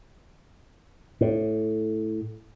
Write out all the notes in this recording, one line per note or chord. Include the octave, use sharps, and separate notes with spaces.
A2